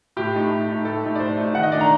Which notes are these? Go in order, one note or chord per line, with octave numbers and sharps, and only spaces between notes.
A2 G4
A3 D#4
A2
A3 D#4
A2 A4
A3 D#4
D5
A2 C5
A3 D#4
D#3 F#5
D#5
A3 D4 D5
A#5